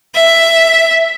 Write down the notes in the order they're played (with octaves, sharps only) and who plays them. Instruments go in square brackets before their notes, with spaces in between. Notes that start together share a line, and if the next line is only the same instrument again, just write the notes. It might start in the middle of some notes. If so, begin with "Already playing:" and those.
[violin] E5